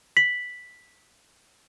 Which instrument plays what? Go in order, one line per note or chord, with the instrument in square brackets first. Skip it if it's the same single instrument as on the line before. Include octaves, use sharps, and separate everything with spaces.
[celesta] B6 F#7